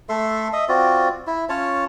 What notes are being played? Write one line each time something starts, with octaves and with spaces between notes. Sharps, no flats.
A3 A4 E5 C6
D#5 E5
C4 F4 F#4 D5
E4
C#4 F4 C#5 A5